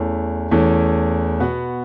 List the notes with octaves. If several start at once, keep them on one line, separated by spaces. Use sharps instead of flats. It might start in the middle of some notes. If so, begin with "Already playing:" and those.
Already playing: E2 E3 A3 C#4
E2 E3 A3 C#4
B2 B3 F#4